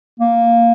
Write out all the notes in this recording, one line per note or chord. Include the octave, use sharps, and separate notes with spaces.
A#3